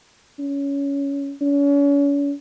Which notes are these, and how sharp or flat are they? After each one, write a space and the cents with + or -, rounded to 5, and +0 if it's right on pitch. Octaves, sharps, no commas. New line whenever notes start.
C#4 +15
C#4 +40